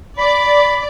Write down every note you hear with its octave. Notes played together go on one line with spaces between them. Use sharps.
D5 B5